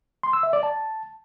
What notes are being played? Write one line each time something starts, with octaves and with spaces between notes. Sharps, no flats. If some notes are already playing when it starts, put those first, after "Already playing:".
C6
E6
E5
D5
A5